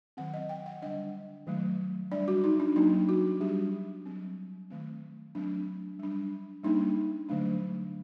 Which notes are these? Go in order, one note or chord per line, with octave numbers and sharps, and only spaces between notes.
D#3 F#3 C4 F#5
D#5
G5
F#5
D3 G3 D4 D#5
D#3 F#3 A3
G3 D4 D5
F#4
D#4
D4
F#3 A#3 D4 D#4
F#4
G3 D4 G4
F#3 C4
D#3 A3 C4
F#3 A3 C4 D4
G3 D4
G3 A#3 D4 D#4
D3 F#3 A3 D4